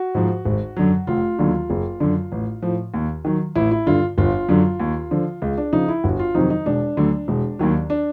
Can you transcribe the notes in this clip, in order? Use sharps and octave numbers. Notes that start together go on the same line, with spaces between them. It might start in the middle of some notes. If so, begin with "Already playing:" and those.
Already playing: F#4
G#2 F3
G#1
F#2 D3 F#3
F1 F4
D#2 D3 F#3
F#1
F#2 D3
A1
A2 F3
D#2
D#3 F#3
A1 E4
E4
G2 D3 F4
G1 F4
F#2 D3 F#3
D#2
D3 F3
C#2
D4
C#3 F3 D#4
E4
G1 F#4
F4
F2 C3 D#3 F#3 D#4
D#4
E1 D4
D2 D3 F#3
E1
D#2 D#3 F#3
D4